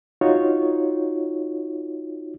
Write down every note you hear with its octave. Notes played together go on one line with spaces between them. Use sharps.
D#4 F4 F#4 C#5